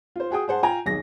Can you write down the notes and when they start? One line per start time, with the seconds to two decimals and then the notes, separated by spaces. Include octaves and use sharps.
0.16 F4 C5
0.31 F#4 G#4 G5 D#6
0.48 G#4 C5 F#5 A5
0.63 F4 G5 G#5 A#5
0.86 D#1 B1 G#4 A#6